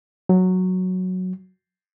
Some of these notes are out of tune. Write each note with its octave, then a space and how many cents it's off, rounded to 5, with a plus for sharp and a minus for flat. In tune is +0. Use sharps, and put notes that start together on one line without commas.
F#3 -5